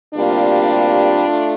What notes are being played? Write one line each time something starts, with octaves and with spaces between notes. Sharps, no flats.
D2 C3 G3 A#3 D4 F4
A3